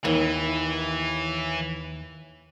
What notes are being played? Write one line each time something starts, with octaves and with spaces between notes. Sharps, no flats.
D#2 E3